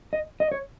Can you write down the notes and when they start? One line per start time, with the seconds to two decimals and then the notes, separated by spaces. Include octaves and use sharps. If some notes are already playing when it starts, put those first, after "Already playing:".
0.13 D#5
0.40 D#5
0.52 C#5